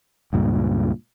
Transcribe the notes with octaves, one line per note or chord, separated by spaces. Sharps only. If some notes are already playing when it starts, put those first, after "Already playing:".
C#2 G2 A#2